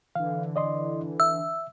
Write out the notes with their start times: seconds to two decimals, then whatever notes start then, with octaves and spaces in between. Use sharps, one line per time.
0.15 D3 E3 F5
0.56 D5 D#5 C6
1.20 E5 E6